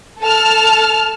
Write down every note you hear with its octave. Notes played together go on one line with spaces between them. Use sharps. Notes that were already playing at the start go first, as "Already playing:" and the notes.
A4 A5 F6